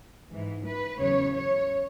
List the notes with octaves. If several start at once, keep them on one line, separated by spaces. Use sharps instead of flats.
G#2 E3
B4
E2 C#3 F#3 C#5
C#5